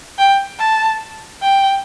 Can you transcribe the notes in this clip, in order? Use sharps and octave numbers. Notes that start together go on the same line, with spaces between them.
G5
A5
G5